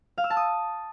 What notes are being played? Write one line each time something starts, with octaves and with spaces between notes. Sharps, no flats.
F5
E6
A5
D#6